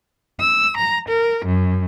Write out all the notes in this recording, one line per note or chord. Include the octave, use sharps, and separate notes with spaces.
E6
A#5
A#4
F#2